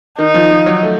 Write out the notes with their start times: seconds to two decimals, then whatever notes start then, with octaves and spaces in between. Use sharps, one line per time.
0.18 D#3 D#4
0.34 F3
0.51 F3
0.66 F#3
0.83 A3